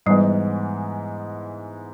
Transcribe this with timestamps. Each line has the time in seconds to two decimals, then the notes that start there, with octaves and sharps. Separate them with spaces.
0.06 G#2 E3 G3 G#3 B3